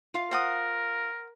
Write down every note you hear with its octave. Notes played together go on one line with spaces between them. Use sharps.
F4 F5
A#4 C5 F#5 D#6